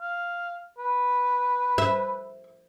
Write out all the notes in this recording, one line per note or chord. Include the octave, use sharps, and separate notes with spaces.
F5
B4
E5